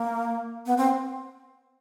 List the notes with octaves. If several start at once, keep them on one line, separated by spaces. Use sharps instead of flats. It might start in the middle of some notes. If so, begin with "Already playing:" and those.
Already playing: A#3
B3
C4